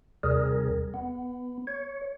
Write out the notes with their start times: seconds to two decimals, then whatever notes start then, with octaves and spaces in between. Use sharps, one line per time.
0.23 D#2 C3 G3 G#4 A#4
0.94 B3
1.67 C#5